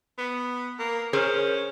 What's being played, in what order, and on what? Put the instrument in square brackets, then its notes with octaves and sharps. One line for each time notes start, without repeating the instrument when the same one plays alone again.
[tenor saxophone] B3
A#3
[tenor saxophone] C#4 [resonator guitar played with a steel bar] G#4 A#4 C5